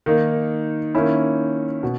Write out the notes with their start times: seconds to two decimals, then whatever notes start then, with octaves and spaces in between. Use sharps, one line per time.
0.06 D#3 A#3 D#4
0.95 D#3 A#3 C#4 E4
1.83 B2